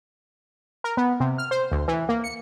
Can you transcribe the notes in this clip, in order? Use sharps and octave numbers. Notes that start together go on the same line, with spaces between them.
A#4
B3
C3
F6
C5
D2
E3
A#3
C#7